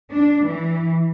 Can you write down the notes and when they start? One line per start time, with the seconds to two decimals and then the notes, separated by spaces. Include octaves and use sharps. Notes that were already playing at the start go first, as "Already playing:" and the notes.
0.11 D4
0.46 E3